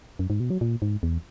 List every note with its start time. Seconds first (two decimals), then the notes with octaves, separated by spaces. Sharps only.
0.19 F#2
0.30 G#2
0.40 B2
0.50 F#3
0.61 A#2
0.82 G#2
1.03 E2